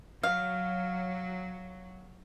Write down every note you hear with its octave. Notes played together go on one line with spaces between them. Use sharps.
F#3 F5